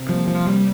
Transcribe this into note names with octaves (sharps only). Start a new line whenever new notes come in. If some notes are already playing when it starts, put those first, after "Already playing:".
Already playing: C3
F3 G3 A#3
F3
C3 G3